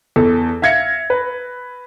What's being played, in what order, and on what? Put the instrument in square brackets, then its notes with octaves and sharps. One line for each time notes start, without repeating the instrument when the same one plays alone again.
[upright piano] E2 A4
E5 F5 G#6 A#6 C#7
B4